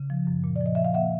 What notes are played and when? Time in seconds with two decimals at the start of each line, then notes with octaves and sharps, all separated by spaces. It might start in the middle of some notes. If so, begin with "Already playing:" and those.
Already playing: C#3
0.10 F3
0.27 F#2
0.44 A#2
0.56 D5
0.61 F3 D#5
0.75 F3 E5
0.84 F5
0.94 A#3 E5 F#5